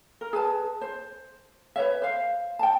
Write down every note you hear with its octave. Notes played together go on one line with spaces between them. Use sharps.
A#4
G#4 B4 A5
C5
B4 C#5 E5
C5 F5
G5 A5